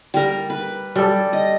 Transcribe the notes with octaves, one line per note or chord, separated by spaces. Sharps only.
G3 A#4
B4
G3 A4
D#5